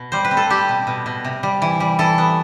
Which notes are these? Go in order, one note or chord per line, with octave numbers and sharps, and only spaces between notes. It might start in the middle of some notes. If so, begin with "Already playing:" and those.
Already playing: B2
G3 C5
B4
C4
A4
G3 G4
B2
B2
B2
C3
G3
E3
G3
E3 A4
B3